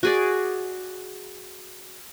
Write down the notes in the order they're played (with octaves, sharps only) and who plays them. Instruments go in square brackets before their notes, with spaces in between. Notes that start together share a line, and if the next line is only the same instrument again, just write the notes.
[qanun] F#4 G#4 D5